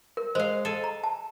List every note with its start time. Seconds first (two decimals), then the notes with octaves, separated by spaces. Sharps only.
0.17 A#4
0.35 G#3 C5 F5
0.65 A4 G#5
0.84 A#5
1.04 A5